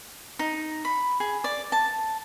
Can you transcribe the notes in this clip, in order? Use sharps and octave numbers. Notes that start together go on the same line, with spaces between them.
D#4
B5
G#4
D5
A5